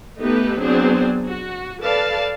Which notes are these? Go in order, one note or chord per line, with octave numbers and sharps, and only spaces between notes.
A3 B3 D#4 G4 A4 B4
F#3 B3 C4 D4 G#4 C5
F#4
A4 B4 D5 F5 A5